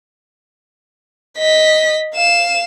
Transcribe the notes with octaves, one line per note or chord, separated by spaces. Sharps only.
D#5 B6
F5 E7